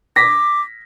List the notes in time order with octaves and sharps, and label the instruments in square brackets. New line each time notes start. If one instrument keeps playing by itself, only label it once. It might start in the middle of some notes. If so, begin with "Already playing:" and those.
[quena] D6 [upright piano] A#6 B6